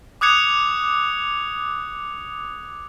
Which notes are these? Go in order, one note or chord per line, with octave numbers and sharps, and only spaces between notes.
D6 D#6 F#6 G#6 C#7 F7